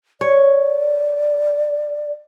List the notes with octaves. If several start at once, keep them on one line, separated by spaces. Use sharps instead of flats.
C#5 D5